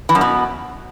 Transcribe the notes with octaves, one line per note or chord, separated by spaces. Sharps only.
E3
F#2
B2